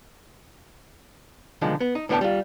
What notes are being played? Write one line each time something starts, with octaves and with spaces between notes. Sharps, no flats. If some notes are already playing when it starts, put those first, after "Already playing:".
B1 D3 D#3 F3 G#3
B3
D#4
A2 D3 B3 D#4 G5 A5
G3 F4